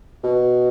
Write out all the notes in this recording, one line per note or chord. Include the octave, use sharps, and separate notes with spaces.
B2